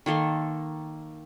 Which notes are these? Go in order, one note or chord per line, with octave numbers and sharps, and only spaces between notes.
D#3 A#3 A4 C6